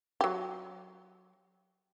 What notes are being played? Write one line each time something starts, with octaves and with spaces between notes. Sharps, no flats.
F#3 G4